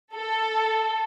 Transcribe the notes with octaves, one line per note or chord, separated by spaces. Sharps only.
A4